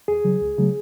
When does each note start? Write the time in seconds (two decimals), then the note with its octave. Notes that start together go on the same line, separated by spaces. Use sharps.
0.08 E2 G#4
0.25 C#3 F#3
0.41 C#2
0.58 C#3 F#3 A3